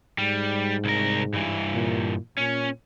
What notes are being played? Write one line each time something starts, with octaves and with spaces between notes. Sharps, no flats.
G#2 G3
C2 A#4
G2 E3
A#2
A#2 C#4